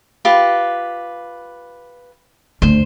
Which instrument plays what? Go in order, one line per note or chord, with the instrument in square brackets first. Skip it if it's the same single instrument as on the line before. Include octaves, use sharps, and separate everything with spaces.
[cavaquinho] F4 G4 B4
[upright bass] D2 [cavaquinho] C5